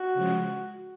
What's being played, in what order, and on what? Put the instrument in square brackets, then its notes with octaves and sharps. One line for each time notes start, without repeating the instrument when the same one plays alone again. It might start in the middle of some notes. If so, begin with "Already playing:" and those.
Already playing: [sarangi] F#4
[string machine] C#3 F3 G#3